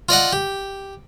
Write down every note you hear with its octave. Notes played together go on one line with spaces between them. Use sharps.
F4 D5 D#5 F#5
G4